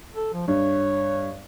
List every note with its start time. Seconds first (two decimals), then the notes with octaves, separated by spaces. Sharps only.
0.16 A4
0.33 F3
0.48 G2 C#5